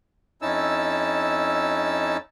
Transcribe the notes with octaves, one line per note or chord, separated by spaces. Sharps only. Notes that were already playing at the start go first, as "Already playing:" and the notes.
F2 C#4 D#4 E4 A5 E6